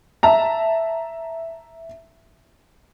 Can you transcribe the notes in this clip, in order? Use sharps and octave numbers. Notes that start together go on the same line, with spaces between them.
E5 A5 A#5